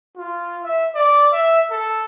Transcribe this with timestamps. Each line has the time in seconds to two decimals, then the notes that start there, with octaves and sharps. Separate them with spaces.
0.17 F4
0.63 E5
0.94 D5
1.32 E5
1.70 A4